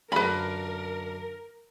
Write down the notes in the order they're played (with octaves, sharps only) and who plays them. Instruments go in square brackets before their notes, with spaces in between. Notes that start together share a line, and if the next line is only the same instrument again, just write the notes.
[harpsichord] F#2 D3 F4 [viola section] A#4 [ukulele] B4 B5